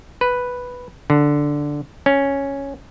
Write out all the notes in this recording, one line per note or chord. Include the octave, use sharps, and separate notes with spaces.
B4
D3
C#4